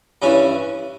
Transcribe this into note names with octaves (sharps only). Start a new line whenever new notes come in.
G2 E3 C#4